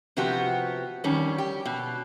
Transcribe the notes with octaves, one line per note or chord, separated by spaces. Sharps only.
C3 F3 B3 F#4 G4
F2 D#3 G3 C#4
G4
B2